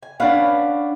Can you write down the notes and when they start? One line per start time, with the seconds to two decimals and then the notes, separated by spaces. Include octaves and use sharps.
0.03 G#5
0.20 C#4 D4 B4 F5 F#5